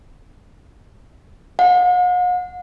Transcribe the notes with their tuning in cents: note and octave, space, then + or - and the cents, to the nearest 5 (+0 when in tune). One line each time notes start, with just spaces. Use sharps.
F#5 -45